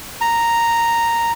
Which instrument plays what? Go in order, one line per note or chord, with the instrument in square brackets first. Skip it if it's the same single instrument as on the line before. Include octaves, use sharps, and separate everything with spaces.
[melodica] A#5